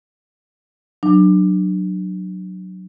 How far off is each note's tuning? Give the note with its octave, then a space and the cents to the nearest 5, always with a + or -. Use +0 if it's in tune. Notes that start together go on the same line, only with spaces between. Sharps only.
F#3 +5 D4 +30